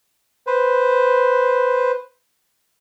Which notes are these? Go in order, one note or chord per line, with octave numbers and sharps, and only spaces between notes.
B4 C5